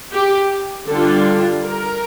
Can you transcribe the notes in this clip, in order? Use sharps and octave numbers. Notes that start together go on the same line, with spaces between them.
G4
D3 G3 D4 F4 A4
A#4